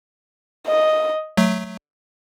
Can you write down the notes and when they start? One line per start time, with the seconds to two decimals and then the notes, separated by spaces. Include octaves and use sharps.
0.67 D#5
1.37 F#3 A3